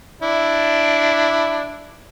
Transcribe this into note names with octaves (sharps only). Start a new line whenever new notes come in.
D4 E4